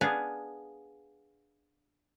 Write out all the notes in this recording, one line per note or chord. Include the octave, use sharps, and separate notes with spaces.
B3 D4 G#4 F5